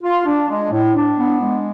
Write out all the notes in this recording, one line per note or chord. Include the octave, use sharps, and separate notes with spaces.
F4
D4
G#3
A2
D4
B3
G#3